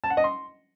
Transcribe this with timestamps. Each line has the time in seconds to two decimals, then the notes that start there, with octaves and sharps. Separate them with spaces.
0.04 A5
0.10 F#5
0.17 D#5
0.24 C6